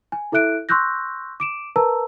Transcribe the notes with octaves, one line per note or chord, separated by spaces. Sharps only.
G#5
E4 A4 E5 F#6 D7
C6 C#6 E6 F#6 G6 A#6
D6 D7 E7
A#4 B4 A5 A#5 E6